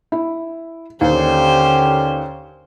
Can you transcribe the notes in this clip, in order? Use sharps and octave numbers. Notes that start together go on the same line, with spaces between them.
E4
D#2 D3 C#4 G4 C5